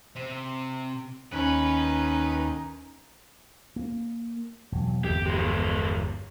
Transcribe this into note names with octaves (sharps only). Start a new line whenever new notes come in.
C3
D#2 C#4 D#4 B4
A#3
E1 F#3
G1 E2 G4
F3 G#3